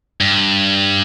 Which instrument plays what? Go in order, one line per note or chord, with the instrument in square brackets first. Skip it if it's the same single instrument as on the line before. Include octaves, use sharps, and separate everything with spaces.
[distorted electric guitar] G2